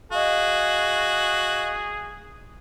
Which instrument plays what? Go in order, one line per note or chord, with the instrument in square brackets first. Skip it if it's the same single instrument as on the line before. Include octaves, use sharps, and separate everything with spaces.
[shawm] F#4 [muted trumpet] G#4 [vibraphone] D#5 F5